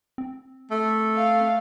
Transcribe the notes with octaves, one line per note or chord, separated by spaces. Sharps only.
C4
A3
F5